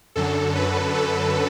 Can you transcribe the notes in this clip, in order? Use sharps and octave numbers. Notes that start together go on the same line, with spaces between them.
F#2 D3 F#3 A4
B4
A4